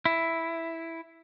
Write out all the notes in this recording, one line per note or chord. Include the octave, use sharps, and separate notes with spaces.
E4